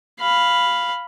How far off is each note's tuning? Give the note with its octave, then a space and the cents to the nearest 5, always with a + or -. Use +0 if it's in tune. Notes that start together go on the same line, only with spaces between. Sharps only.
F5 +0 B5 +0